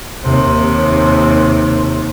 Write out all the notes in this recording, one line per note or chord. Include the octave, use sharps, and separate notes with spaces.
D#2 C3